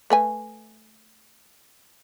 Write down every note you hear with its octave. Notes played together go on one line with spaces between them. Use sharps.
A3 B4 G#5